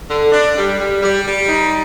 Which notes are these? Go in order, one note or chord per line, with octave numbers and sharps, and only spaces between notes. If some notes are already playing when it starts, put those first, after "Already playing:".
D3
D4
G3
G3
G3
G3
D#4